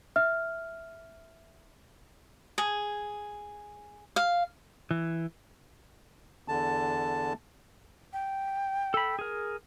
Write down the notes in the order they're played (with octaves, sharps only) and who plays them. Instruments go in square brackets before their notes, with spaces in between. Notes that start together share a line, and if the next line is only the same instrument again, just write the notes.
[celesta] E5 F6
[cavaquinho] G#4
F5
[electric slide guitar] E3
[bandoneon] E2 D3 A5
[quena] G5
[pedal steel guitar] A4 B5
G#4 A#4